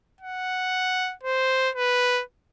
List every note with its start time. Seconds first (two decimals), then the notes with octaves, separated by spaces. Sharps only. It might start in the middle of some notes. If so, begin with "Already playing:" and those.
0.21 F#5
1.23 C5
1.75 B4